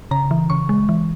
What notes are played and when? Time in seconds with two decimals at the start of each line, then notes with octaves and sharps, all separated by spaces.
0.11 C#3 A#5
0.31 E3
0.50 C#3 C#6
0.69 G#3
0.89 E3